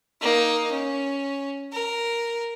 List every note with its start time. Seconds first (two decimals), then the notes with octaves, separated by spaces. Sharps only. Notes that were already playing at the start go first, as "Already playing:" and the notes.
0.21 A#3 D#4
0.71 C#4
1.72 A#4